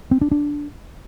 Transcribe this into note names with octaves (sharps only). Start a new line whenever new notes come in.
C4
D4
D4